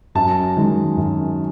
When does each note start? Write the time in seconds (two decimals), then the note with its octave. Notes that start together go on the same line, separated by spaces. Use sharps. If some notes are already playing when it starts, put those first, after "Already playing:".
0.15 F#2 A5
0.57 D#3 G#3
0.97 F#2